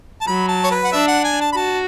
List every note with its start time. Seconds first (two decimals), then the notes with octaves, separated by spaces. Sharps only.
0.21 A5
0.27 F#3 B5
0.49 A5
0.64 C#5
0.71 B4
0.84 F#5
0.92 D4 E5
1.08 F#5
1.24 G#5
1.41 A5
1.53 B5
1.56 F#4 A5